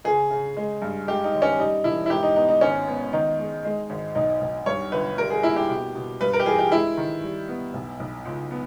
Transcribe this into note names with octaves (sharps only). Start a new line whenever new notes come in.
C#3 G#4
C#3
G#3
G2
G#3 G4
D#4
D#2
C#4
G3 D#4
E1 E4
E4
G#2 G4
D#4
B3 D#4
D#4
G#1 C#4
B3
D#3 D#4
G#3
G#3
G#1
B1 D#4
B1
G2 C#5
G1 B4
G3 A#4
G#4
A#3 E4
G4
B2
B2
G2 B4
A#4
G4
E3 G#4
G4
G#3 E4
D#3
G3
B3
B1
B1
C#2
B3